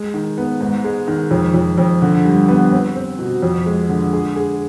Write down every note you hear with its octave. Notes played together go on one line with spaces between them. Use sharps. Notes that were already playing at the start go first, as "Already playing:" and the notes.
Already playing: G#3
D#3
B3
G#2
G#3
D#3
F2
F2
F2
D3
G2
B3
C4
C4
B2
F2
G#3
D3
G#4
G#4